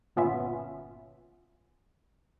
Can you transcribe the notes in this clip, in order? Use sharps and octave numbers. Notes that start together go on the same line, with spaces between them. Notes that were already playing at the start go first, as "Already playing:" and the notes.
G1 A#2 B3 C#4 F4 E5